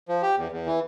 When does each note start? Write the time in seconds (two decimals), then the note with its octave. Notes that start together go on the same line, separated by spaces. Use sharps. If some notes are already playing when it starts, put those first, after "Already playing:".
0.09 F3
0.22 G4
0.37 E2
0.52 E2
0.66 E3